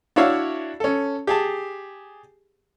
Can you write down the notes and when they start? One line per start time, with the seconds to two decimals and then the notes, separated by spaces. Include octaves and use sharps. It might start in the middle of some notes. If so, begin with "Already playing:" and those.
0.16 D4 E4 F#4 C#5 E5 F5
0.80 C#4 A4
1.27 G4 G#4 A5